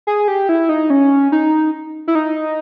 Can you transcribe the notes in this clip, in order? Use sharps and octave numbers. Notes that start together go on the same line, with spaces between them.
G#4
G4
E4
D#4
C#4
D#4
E4
D#4